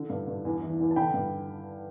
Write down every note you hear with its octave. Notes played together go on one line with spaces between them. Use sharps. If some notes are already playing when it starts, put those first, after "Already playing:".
Already playing: D3
G2
G2
E2
E3
E2
A5
D3 G5 B5
G2